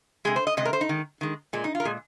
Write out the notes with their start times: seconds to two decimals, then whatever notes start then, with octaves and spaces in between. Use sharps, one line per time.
0.25 C3 G#3 G#4
0.36 C5
0.47 D#5
0.57 C3 G#3 D#5
0.65 A#4
0.73 C5
0.81 D#4
0.89 D#3 G#3
1.21 D#3 G#3
1.53 A#2 G#3
1.64 D#4
1.75 F4
1.80 A#4
1.85 A#2 G#3 G#4